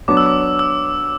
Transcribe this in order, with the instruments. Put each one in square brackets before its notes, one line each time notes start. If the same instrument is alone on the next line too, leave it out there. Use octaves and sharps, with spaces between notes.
[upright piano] F#3 B3 D4 [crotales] D6
[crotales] E6
D6
E6